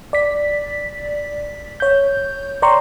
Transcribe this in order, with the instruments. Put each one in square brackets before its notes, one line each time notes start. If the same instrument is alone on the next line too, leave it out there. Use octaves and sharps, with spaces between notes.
[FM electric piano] D5 B6
C#5 G6
C#5 D5 G5 A#5 C6 C#6